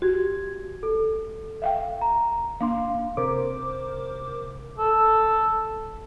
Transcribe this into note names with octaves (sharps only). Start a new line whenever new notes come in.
F#4 G4 G#6
A4
E5 F5 G5
A#5
A#3 D4 F5 C6
C3 A#4 C5 D6
A4